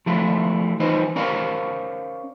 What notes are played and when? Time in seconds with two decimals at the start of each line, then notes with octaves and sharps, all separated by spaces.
0.06 F3 G#3 A3 E4 F4
0.80 E3 D#4 F4 B4 C5 D#5
1.16 C#4 A#4 C5 D5 F5 A#5